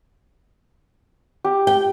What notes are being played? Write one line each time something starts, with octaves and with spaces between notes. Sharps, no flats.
G4
G5